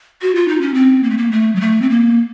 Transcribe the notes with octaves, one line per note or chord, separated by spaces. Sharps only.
F#4
F4
D#4
C#4
C4
A#3
A3
A#3
A3
F#3
A3
C4
A#3